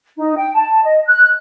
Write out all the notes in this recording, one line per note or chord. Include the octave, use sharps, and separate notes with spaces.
D#4
G5
A5
D#5
F#6